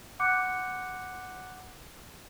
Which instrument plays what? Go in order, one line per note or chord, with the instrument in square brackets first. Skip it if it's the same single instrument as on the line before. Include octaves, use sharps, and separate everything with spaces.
[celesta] F#5 C6 D6 F#6 G6 C#7